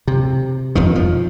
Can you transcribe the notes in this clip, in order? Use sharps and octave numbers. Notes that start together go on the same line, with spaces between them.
C3
E1 F2 D#3
F3